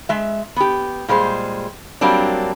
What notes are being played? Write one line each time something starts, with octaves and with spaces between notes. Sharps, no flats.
G#3 E5
B3 G4
A#2 G3 G#3 C5
F#3 G3 A#3 C4 D4